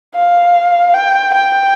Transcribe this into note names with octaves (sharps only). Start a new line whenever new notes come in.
F5
G5
G5